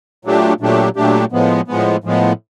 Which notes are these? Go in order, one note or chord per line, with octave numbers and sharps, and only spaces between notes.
A#2 F#3 A3 D4 G4
A#2 F#3 A3 D4 G4
A#2 F#3 A3 D4 G4
A2 F3 G#3 B3
A2 F3 G#3 B3
A2 F3 G#3 B3